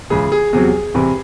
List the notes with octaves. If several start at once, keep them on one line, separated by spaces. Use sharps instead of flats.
C#2 C#3 E3 G#4
G#4
E2 C3 F#3 G#4
C2 C3 E3